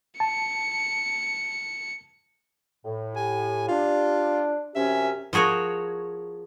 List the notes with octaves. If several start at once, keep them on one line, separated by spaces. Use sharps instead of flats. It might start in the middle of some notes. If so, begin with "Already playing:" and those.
A5 C#7
A2
G4 G#5
D4 F4
F#2 C3 C#4 G4 E5
F3 F#4 G#4 A#4 C#5